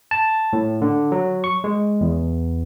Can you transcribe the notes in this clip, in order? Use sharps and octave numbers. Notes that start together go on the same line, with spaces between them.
A5
A2
D3
F#3
C#6
G#3
E2